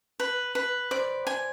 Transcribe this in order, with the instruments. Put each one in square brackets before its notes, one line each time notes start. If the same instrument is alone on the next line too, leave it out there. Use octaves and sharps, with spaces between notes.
[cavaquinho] B4
B4
[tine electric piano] C5 [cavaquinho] D5
[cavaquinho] G#5